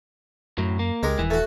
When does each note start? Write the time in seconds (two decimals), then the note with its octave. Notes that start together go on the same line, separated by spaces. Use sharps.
0.58 F#2 A2 F#3
0.79 A#3
1.03 C#2 G#3 G4 A#4
1.19 D#1 E3
1.30 A3 F#4